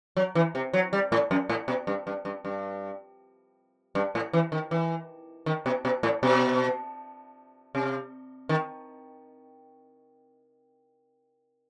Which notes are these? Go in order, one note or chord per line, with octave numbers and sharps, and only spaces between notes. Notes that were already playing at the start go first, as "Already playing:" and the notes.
F#3
E3
C3
F#3
G3
A2
F#2
A2
B2
G2
G2
G2
G2
G2
A2
E3
D#3
E3
D#3
B2
B2
A2
B2
C3
D#3